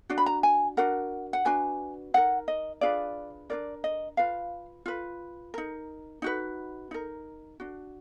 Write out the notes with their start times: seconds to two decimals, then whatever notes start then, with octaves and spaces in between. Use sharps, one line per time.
0.09 D4 F#4
0.18 B5
0.26 A#5
0.43 G#5
0.77 D4 F#4 A#4 F#5
1.33 F#5
1.45 D4 F#4 B4 G#5
2.14 D#4 A#4 F#5
2.48 D#5
2.81 D4 F4 G#4 B4 D5
3.50 D4 F4 A#4 D5
3.84 D#5
4.17 F4 B4 F5
4.86 F4 B4
5.54 D#4 A#4
6.22 D#4 F#4 B4
6.91 D#4 A#4
7.60 D4 F#4